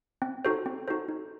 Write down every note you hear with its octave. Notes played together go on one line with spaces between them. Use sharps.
C4
D#4 F#4 A4 C5
C4
D#4 F#4 A4 C5
D#4